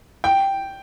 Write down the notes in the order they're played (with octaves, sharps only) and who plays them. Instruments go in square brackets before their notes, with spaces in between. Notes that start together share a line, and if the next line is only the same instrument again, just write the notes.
[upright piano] G5